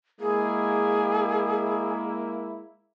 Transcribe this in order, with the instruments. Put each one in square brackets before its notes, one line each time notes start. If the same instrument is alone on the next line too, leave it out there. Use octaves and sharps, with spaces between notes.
[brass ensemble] G#3 A#3 E4 [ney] G#4